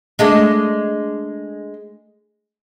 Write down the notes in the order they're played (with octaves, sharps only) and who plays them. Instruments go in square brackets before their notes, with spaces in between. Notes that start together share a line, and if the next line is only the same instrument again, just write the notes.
[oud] G#3 A3 D4